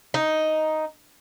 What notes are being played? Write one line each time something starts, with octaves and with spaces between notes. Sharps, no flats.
D#4